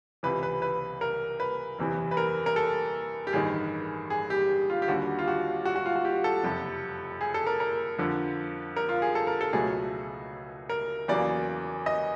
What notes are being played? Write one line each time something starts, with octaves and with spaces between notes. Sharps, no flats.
C#2 C3 E3 B4
B4
B4
A#4
B4
F#1 E2 C3 E3
B4
A#4
A#4
A4
G4
A1 G2 D#3 G#4
G#4
G4
F4
G4
D#2 D3 G3 F#4
F4
F#4
F#4
F#4
F4
F#4
G4
A4
F#1 F2 C3
G#4
A4
A#4
A#4
F2 D3 F3
A#4
F4
G#4
A4
A#4
A4
C#2 B2 F#3 A3 G#4
A#4
E2 C#3 F#3 A#3 D5
D#5